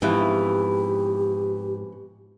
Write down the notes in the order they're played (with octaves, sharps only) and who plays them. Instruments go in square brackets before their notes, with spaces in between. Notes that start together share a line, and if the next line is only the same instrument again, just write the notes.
[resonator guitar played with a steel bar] F2 B2 E3 [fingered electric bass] G#2 [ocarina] G4